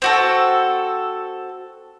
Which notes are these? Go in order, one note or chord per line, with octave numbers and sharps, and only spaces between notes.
C4 F#4 A4